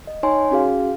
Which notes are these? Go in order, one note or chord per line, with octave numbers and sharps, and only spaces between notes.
D#5
D#4 C#5 G#5 C6
C#4 F#4 G#4 F5